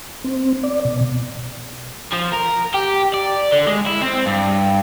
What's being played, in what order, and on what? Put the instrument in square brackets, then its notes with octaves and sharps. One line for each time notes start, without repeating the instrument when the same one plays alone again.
[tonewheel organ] C4
D5
B2
[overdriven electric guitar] F3
A#4
G4
D5
D3
G#3
E4
C4
G2